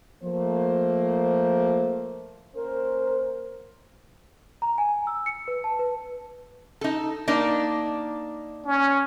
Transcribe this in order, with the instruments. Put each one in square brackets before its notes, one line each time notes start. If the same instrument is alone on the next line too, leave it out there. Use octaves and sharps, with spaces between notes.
[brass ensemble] F3 A3 A#3 C5
[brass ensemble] A#3 C#4 C5 [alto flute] A#4
[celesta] A#5
G#5
E6
C#7
B4
A5
B4
[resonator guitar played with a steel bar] D#4 A4
A#3 D4 D#4
[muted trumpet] C#4